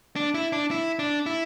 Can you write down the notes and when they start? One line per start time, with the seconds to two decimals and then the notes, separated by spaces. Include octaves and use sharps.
0.16 D4
0.34 E4
0.52 D4
0.71 E4
0.99 D4
1.26 E4